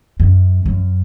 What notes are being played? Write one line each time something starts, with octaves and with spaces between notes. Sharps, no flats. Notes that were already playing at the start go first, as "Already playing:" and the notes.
F#2
F#2